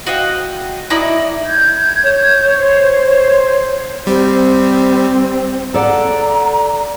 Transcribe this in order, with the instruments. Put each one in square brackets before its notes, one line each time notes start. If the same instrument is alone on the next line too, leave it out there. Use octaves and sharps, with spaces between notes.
[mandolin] F#4 D#5 F5 G5
D#4 E4 D5 D#5
[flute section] G6 G#6
[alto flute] C#5
[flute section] C5
[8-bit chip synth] G3 [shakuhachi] C4
[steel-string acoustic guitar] A4 D5 F#5 [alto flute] A#5